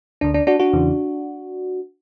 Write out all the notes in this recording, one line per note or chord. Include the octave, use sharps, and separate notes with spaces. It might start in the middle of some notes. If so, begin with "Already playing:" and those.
D2 D3 D4
D4
D4 F#4
D4 F#4
E2 C#3 E3